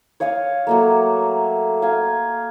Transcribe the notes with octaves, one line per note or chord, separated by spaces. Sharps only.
C#5 F5 G#5 D#6
F#3 A3 A#3
F5 G#5